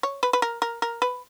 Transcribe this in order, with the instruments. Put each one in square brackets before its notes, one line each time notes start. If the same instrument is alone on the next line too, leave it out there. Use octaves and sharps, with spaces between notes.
[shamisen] C#5
B4
B4
A#4
A#4
A#4
B4